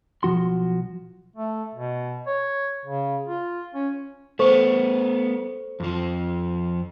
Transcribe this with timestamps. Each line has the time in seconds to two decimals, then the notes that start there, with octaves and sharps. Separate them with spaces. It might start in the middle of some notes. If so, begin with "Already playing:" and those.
0.23 B1 F3 F#4 C6
1.36 A3
1.75 B2
2.26 C#5
2.85 C#3
3.27 F4
3.74 C#4
4.39 A3 B3 A4 C5 C#6
5.80 F2 F3